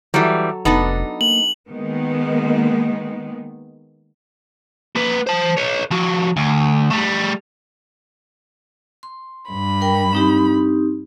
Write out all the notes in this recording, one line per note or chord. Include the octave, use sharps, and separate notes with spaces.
E3 F#3 G3 A4
F1 B3 D4 D#4 A4
A#3 F#7
D#3 G#3 A#3 B3
A#3 B4
C5 A5
B4 C#5
F3 F#4
D2
G3 A3
C6
G2 B5
A#4 G5
C4 D#4 G4